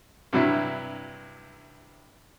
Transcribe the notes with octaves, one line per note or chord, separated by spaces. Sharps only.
G2 C3 F#3 E4